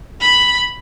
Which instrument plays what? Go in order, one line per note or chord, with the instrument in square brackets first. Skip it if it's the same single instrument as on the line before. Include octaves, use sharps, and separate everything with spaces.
[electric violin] B5